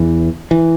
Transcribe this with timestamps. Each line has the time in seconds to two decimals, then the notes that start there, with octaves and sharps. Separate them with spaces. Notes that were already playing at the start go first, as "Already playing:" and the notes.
Already playing: E2 E3
0.51 E3